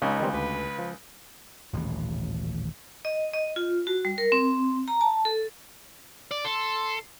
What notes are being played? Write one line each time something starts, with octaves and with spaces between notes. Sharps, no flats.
C#2 C#3 D#4 C#5
D#3 G3 C4
D2 B4
F3
D#1 A1 D#2 B2
D#5
D#5
F4
F#4
G3
A#4
C4
A#5
A5
A4
D5
A4 C6